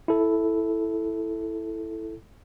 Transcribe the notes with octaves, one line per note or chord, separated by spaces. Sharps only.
E4 A4